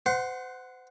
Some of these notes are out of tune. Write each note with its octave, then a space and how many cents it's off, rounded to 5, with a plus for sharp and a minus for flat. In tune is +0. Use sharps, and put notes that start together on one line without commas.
C5 -35 F#5 +0 C6 +0